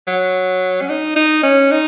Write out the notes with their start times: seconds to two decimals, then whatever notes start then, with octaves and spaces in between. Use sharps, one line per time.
0.07 F#3
0.82 C#4
0.89 D#4
1.16 D#4
1.43 C#4
1.71 D#4